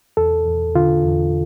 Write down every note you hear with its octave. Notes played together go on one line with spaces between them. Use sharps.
E2 A4
E2
D3 F4
E2